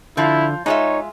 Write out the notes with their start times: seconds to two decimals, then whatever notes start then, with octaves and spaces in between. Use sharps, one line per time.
0.17 D3 F3 E4 F4
0.66 G#3 D#4 F4 C#5 E5